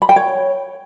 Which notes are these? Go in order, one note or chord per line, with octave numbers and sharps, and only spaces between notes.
B5
G5
C#5